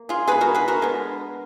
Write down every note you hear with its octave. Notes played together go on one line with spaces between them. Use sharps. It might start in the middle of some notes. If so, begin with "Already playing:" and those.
Already playing: A#3
F4 G#4
B2 G#3 B3 G#4 B4
F#4 A#4
G#4 B4
F#4 A#4
D3 G#3 B3